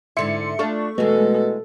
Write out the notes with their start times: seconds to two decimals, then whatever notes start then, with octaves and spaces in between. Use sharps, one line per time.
0.17 G#2 D3 E4 E5 C6 C#7
0.59 A3 D4 F4 A4 C#6
0.98 B2 E3 G#3 A3 A4